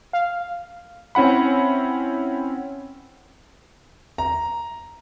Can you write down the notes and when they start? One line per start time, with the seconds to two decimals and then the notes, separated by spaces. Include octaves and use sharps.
0.13 F5
1.15 C4 C#4 E4 F#5 B5
4.18 A#5